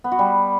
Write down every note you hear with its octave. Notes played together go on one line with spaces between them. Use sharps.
B3
F#4
G3